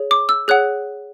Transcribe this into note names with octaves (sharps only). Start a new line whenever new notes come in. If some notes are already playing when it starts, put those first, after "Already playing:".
Already playing: G#4 C#5
D6
E6
G#4 C#5 F#5 F#6